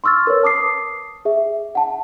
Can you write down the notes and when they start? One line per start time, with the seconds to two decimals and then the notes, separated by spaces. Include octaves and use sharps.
0.04 C6 C#6 E6 F6 A6
0.27 A#4 B4 C#5
0.43 A5 D6 D#6 C7
1.25 G#4 E5
1.75 F#5 A5